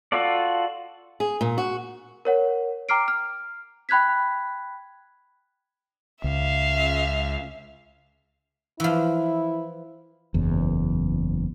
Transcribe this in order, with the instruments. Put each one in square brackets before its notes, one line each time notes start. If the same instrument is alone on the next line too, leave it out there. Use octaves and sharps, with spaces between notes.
[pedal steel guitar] F4 F#4 A4 D5
[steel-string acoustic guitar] G#4
A#2
F#4
[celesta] A#4 C#5 F#5
G5 A#5 D6 F6 C7 D7
F6
G5 B5 F#6 G#6 B6
[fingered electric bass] C#2 [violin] E5 F5
[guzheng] E3 F3 [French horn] E4
[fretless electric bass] F#1 E2